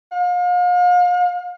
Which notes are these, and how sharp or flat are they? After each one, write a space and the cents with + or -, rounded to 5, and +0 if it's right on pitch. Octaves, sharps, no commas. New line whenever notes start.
F5 +40